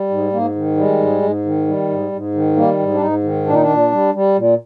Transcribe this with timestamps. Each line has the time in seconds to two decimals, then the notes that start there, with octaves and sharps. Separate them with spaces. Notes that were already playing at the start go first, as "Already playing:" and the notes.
Already playing: G3
0.10 G#2
0.32 G#2 A#3
0.55 D#3
0.77 G3 G#3
0.99 G#2
1.22 G#2
1.45 D#3
1.67 G3
1.89 G#2
2.12 G#2
2.34 D#3
2.56 G3 A#3
2.79 G#2
2.94 D4
3.01 G#2 D#4
3.24 D#3
3.46 A#2 D4
3.54 D#4
3.61 D4
3.69 A#2
3.92 G3
4.14 G3
4.37 A#2